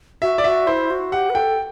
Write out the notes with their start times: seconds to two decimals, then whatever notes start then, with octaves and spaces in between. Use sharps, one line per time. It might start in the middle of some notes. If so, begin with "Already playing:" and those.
0.22 F#4 E5
0.38 D5
0.44 F#4 E5
0.67 E4 C5
0.90 F#4
1.12 G4 F#5
1.30 B4
1.35 A4 G5